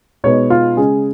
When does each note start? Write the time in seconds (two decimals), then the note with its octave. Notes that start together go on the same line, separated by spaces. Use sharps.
0.24 B2 G#3 B3 D#4 C#5
0.50 F4
0.77 C#3 G#3 C#4 G#4